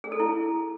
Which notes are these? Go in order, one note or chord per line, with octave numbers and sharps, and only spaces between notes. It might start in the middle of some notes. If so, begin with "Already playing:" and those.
G#4
A4
E4